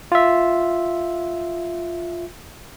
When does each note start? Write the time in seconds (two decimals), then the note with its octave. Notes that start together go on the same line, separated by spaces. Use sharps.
0.12 F4 E5